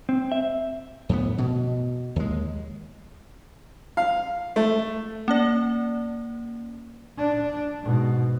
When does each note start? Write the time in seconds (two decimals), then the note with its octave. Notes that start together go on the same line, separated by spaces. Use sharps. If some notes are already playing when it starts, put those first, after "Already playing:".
0.09 C4
0.32 E5
1.09 F2 A2 B3
1.38 B2
2.16 D#2 G#3
3.97 F5
4.56 A3
5.28 A#3 C#4 D5
7.18 D4
7.83 G#2 B2